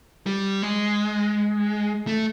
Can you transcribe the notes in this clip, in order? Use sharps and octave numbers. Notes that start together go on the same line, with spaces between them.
G3
G#3
A3